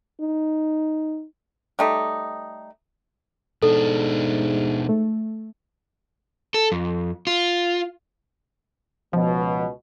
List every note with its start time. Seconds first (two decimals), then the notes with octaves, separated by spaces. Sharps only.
0.21 D#4
1.79 G3 A3 D#4
3.63 G#2 B2 D4 A4
4.89 A3
6.54 A4
6.72 F2
7.27 F4
9.13 C#2 B2 F3